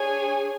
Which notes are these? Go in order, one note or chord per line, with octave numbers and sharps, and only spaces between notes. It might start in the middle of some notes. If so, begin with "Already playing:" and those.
Already playing: D4 G#4 C#5 G#5